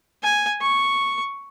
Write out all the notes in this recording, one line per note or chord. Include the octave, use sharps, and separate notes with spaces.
G#5
C#6